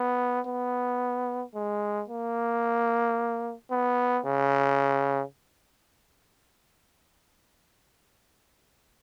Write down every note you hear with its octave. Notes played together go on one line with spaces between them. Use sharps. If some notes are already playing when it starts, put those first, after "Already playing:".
Already playing: B3
B3
G#3
A#3
B3
C#3